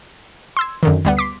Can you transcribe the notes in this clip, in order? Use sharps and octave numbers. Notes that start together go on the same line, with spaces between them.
C6 E6 G#6
F#2 D3 D#3
D2 G3 B3
C6 D6 B6